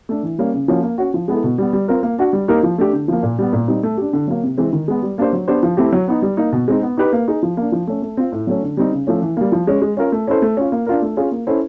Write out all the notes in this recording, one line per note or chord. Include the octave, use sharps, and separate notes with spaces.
A3 D4
E3
G3 A#3 C#4
C#3
F3 A#3 C#4 F#4
A#3
C#4 F#4
F3
G#3 B3 E4 A4
B2
G3 B3
G3
C4 F4 A#4
A#3
D4 F#4
G3
A#3 D#4 G4 A#4
F3
A3 D4 G4
D3
F3 A#3
A#2
G3 B3
A#2
G3 C4 D#4
A3
D4 G4
D3
F#3 A#3
C3
E3 G#3 C4
D#3
G#3 B3
G3
A#3 D4 G4 C5
F#3
B3 D4 G4 C5
F3
A3 C4 E4 G4
F#3
B3 D#4
G3
A#3 D#4
B2
G#3 C4 D#4
B3
D#4 G4 B4
A#3
D#4 G#4
F3
A#3 D4
F3
A3 C#4
A3
C4 F4
A2
F#3 A3 C#4
D3
G3 C4 D#4
C#3
F3 A3 C#4
E3
G3 A#3
F3
G#3 C#4
G#3
C#4 F4 A#4
A3
C#4 E4 A4 C5
A3
C#4 F4
A#3
D4 F4 A#4
A3
C#4 F4 G#4
A#3
C#4 E4 A4 C5